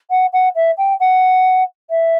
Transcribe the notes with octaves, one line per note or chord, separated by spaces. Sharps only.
F#5
F#5
E5
G5
F#5
E5